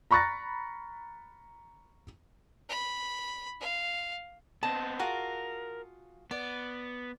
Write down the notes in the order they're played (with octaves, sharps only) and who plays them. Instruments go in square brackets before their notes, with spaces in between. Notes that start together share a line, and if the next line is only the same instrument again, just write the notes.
[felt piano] A#5 B5 C#6 F#6 A6 A#6
[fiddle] B5
F5
[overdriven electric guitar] B3 C4 [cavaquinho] D#5 [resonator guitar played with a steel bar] A5
[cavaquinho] F4 F#4 G#4 [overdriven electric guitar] A#4
[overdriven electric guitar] B3 [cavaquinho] D5